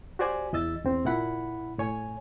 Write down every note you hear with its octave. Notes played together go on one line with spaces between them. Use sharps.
F#4 G4 C5 D5 G#5
E2 E4 D#5 E6 A6
E2 C4
A#2 E4 F#5 B5
A2 C#5 G#5